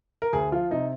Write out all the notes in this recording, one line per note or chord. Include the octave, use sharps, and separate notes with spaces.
A#4
D2 G#4
F3 F4
C3 D#4